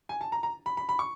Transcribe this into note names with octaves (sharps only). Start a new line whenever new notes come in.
G#5
A5
A#5
A#5
B5
B5
B5
C#6